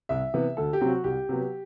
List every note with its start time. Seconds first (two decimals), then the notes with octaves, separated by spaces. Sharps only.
0.09 C2 E5
0.34 C3 E3 B3
0.57 D2 A4
0.73 G4
0.81 C3 F#3 C4
0.88 F#4
1.04 C2 G4
1.29 C3 F#3 B3